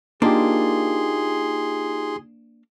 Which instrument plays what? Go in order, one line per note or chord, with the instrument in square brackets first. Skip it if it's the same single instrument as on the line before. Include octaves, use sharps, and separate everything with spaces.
[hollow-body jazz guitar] A#3 D4 [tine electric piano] D#4 F4 G4 [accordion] G#4 C6